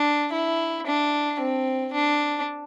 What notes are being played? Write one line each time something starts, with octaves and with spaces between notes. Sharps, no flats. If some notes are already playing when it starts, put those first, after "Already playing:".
Already playing: D4
E4
D4
C4
D4